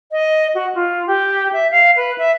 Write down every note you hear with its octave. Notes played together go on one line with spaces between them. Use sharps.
D#5
F#4
F4
G4
E5
F5
B4
E5